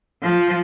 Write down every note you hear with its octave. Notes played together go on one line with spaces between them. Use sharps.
F3